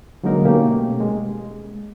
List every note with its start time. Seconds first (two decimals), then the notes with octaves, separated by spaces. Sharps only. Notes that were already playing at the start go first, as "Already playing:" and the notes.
0.24 D3 F#3 G#3 A#3 D#4 A#4
0.44 B2 A3 A#3 C#4 G4
1.00 G#3